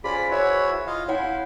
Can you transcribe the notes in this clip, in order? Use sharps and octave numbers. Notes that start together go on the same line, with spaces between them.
C#4 F4 G#4 C5 D5 G#5 B5
E4 F#4 B4 C#5
F4 D#5 F5
E4 C#5 F5 F#5 G#5